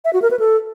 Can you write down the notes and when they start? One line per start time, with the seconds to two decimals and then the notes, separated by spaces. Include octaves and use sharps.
0.05 E5
0.13 F#4
0.22 A#4
0.31 B4
0.39 A4